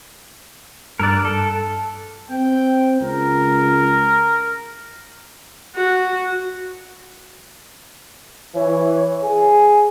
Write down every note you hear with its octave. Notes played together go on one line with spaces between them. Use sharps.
G2 A#4 D5 E6 F#6
A4
C4 G5
C#2 A#4
F#4
E3 C#5
G#4 G#5